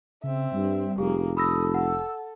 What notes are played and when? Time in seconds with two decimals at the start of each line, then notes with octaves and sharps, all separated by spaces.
0.24 C#3 C4 E5
0.54 G2 G3
0.98 F1 A#3 G4 G#4
1.37 A4 B5 D#6 E6 A#6
1.74 F#5 E6